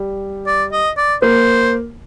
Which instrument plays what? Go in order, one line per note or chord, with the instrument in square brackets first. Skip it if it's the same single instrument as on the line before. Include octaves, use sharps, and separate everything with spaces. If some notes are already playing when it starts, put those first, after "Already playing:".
Already playing: [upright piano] G3
[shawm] D5
D#5
D5
[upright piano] A#3 [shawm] C5